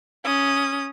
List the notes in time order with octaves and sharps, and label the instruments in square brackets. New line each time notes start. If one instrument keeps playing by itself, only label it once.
[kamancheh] C#4 D#6